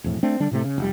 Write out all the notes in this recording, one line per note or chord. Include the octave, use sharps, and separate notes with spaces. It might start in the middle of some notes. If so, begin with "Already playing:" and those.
E1 F2 A2
A3 C4 D4
D3 G3 D4
A2 C3 A3
C#3
F1 G3